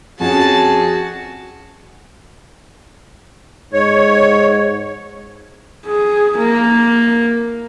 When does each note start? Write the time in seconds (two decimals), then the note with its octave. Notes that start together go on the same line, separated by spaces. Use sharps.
0.20 F2 C#4 F#4 G#4 A5
3.73 G#2 C#5
5.86 G#4
6.37 A#3